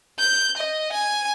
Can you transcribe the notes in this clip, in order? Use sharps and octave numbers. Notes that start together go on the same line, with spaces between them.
G6
D#5
G#5